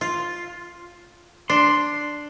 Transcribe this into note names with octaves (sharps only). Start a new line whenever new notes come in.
F4
D4 C6